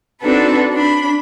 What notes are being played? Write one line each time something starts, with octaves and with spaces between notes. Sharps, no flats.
C4 D4 D#4 F#4 A4 B4
D4 B5